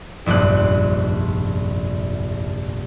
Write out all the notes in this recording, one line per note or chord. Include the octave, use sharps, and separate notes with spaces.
F1 A#1 G2 C4 F#6